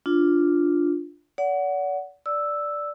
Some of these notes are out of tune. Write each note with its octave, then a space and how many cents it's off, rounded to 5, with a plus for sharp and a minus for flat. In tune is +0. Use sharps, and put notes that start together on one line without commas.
D4 +0 F4 +0
D5 -40 F#5 +0
D5 +0 E6 +0